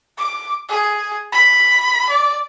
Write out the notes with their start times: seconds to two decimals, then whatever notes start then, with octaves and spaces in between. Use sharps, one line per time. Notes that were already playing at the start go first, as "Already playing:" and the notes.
0.18 D6
0.69 G#4
1.32 B5
2.10 D5